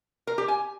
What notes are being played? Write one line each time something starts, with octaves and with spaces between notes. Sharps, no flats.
A#4
G4
G#5